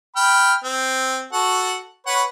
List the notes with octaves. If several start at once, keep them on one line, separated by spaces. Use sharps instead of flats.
G5 B5 F6
C4
F#4 A4 F#5
B4 C#5 F#5